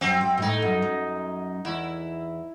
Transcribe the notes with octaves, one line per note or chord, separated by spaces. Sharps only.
F#2 C4
F#2
B2
A2 D#4
F#2
F#2
E2 E4